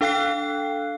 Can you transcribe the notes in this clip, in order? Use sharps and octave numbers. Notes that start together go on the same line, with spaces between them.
D4 A4 F5 G5 F#6 C7